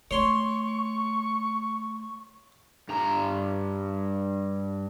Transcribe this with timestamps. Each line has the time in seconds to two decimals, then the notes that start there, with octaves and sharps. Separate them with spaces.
0.11 A3 C#5 C6 C#6
2.89 G2 A#5